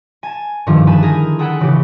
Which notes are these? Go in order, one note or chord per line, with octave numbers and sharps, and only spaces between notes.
G#5 A5
G2 D3 D#3 F3 D4 E4
G#5 A5 B5 F#6 G6 A6
G#4 A#4 G#5
G#4 A4 F#5 G5 B5 F#6
A#2 C#3 E3 C#4 G4